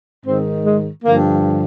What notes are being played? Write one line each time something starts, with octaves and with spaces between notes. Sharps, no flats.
G#2 D#3 C4
G#3
G2 D3 F3 A#3